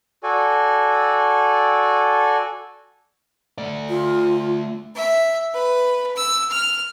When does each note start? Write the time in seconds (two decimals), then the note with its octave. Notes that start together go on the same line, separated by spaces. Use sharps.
0.23 F#4 A4 D5 G#5
3.58 A3 D5
3.89 F4
4.95 E5
5.53 B4
6.16 E6
6.51 F6